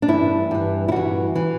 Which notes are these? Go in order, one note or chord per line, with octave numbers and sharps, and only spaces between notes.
D4
G2 E3 E4
G2 E3
E4
G2 E3 F#4
E3